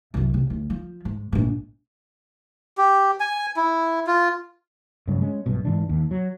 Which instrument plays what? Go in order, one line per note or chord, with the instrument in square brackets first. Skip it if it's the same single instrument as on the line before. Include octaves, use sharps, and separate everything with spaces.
[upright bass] C2 F#2
C3
D2
F3
G#2
A#1 G#2
[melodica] G4
G#5
E4
F4
[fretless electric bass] D2 G2 C#3 F#3
G#3 C#4
B1 G2 B2
G#2 E3 D4
D#2
F#3